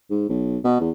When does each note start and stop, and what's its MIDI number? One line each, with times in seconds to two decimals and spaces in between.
0.10 0.28 44
0.29 0.58 35
0.64 0.78 47
0.81 0.90 40